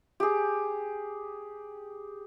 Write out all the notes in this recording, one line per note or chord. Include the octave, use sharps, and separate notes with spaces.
G4 G#4